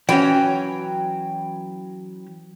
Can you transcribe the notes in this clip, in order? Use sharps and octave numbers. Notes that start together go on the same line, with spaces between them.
E3 F#3 C#4 G5